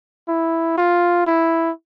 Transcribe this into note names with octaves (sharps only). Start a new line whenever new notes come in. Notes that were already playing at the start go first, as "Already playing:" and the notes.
E4
F4
E4